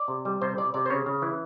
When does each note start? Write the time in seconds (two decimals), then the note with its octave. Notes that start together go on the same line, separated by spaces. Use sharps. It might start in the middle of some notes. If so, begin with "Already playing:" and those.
Already playing: D5
0.08 C3
0.25 G3
0.42 C3 C5
0.58 C3 D5
0.74 C3 D5
0.86 C5
0.90 C#3 C#5
1.06 C#3
1.22 E3